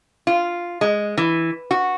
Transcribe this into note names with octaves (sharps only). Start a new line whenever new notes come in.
F4
G#3
E3
F#4